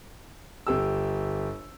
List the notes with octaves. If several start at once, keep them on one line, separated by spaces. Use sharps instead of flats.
G1 G4 E6